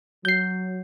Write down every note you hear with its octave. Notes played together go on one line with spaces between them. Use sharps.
F#3 G6 C7